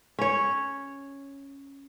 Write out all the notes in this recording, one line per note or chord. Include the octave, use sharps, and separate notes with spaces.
C#4 C#5